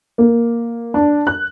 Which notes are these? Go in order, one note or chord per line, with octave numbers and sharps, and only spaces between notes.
A#3
D4
F#6